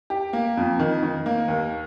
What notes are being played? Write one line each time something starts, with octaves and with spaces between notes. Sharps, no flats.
G4
A#3
F2
D#3
D#3
A#3
D#2